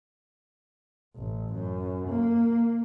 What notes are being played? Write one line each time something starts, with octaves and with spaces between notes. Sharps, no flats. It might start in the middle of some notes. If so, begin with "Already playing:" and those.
A1
F#2
A#3